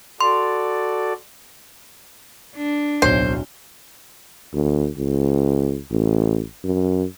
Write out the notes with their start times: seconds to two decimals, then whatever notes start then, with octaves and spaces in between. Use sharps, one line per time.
0.21 F#4 A4 D5 C6
2.56 D4
3.02 D1 B1 C5 G7
4.54 D2
4.98 C#2
5.91 A1
6.64 F#2